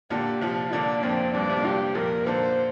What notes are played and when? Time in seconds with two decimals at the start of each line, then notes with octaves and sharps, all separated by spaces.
0.10 A#2 D3 G4
0.41 C3 F3 F4
0.72 A#2 D3 D4
1.03 F2 A#2 C4
1.34 G2 D4
1.49 C3
1.57 A#2
1.64 G2 G4
1.95 F2 A#2 A#4
2.25 A#2 D3 C5